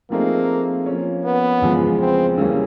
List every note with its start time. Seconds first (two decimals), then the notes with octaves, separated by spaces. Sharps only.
0.10 F3 A3 A#3 C4 D#4 G#4
0.86 F3 A#3 C#4
1.24 B3
1.62 E2 C#3 F3 G#3
2.00 C4
2.38 C#3 E3 G3 A#3 C#4